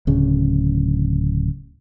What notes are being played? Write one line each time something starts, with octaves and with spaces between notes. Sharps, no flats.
D1 C#3